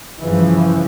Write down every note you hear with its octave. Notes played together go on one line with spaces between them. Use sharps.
G2 C#3 E3 F3